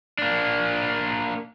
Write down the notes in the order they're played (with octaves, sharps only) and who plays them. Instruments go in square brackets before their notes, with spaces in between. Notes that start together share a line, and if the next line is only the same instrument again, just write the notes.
[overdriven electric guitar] A#3 D4